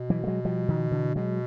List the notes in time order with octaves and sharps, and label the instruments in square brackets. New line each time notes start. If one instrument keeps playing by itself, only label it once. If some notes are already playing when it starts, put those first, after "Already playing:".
Already playing: [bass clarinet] B2
[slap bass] E3 F#3
A3
F#3 G#3
F3 G3
D#3 F3
D3 E3
[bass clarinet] B2 [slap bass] F#3 G#3